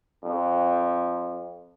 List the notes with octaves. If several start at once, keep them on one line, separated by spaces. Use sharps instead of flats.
F2